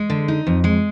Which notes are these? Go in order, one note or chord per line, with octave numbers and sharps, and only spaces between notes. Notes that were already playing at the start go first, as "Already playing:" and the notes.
Already playing: G#3
D3
D#4
F2
G#3